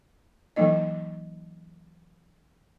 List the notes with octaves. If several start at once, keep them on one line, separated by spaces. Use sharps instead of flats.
E3 F#3 A#3 D#4 D#5